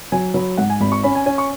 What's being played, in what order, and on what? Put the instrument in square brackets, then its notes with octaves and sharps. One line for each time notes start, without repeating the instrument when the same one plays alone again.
[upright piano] F#3 [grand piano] G#5
[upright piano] F#3 [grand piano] B5
[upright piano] G#2 [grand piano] F#5
[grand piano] G#5
[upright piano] G#1 [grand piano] B5
[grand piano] C#6
[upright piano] C#4 [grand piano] B5
[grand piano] G#5
[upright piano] C#4 [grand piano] G#5
[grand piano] C#6